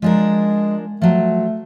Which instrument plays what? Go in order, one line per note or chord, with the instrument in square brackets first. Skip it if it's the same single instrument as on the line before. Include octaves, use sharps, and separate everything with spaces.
[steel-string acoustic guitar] F3 D4 A#4 [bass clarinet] G#3
[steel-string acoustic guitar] F3 F#3 [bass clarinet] A3